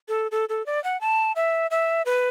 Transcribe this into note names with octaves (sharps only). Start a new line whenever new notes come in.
A4
A4
A4
D5
F#5
A5
E5
E5
B4